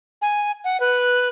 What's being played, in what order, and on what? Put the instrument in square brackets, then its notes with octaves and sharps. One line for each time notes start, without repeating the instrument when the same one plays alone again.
[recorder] G#5
F#5
B4